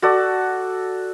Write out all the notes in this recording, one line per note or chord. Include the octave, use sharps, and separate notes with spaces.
F#4 A4 D5